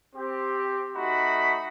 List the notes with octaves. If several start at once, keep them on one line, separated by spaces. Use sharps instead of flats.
C4 G4
A3 D#4 F#4 B5